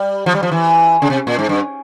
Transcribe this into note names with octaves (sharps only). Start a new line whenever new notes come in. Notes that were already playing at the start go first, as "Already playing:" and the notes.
Already playing: G3
F3
G3
F3
E3
C#3
C3
A#2
G#2
G2